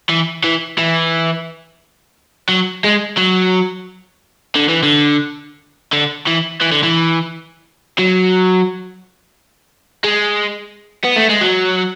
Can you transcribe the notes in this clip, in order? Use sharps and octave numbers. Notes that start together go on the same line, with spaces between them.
E3
E3
E3
F#3
G#3
F#3
D3
E3
D3
D3
E3
E3
D3
E3
F#3
G#3
B3
A3
G#3
F#3